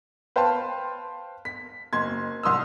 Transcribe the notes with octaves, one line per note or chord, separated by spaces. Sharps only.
B4 C5 F5 G5 A5 C6
B6
F#1 C6 G#6
C2 C6 D#6 E6